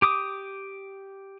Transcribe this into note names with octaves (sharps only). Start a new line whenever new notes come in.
G4 D6 D#6